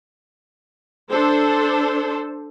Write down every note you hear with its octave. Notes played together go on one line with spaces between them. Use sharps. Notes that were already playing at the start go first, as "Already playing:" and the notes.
D4 A4 C5